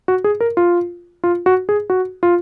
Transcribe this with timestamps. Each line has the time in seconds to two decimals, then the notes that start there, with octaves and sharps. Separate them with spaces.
0.08 F#4
0.24 G#4
0.40 A#4
0.57 F4
1.24 F4
1.46 F#4
1.69 G#4
1.90 F#4
2.23 F4